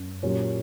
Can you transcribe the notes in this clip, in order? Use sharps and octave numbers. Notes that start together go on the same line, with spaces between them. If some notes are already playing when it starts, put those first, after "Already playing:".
Already playing: F#2
A#2 F#3 C#4 G4 C#5